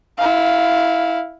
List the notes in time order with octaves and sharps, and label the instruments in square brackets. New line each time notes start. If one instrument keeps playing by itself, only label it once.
[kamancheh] E4 F5